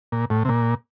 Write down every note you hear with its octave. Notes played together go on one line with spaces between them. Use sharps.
A#2
A2
C3
A#2